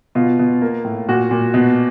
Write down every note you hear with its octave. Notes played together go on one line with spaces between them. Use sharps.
B2 F4
B2
A#3
A2
A#2 F#4
A#2
B2